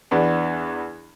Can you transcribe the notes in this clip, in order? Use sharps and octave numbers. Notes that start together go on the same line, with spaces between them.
E2 B3 D4